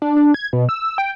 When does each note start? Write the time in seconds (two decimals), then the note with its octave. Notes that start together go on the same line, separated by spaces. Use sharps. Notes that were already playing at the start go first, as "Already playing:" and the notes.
0.02 D4
0.17 D4
0.34 G#6
0.53 B2
0.69 E6
0.98 G5